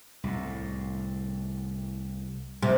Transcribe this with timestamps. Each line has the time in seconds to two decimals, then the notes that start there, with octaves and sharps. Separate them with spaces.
0.24 C2 A2
2.62 C3 G3 G#3 A#3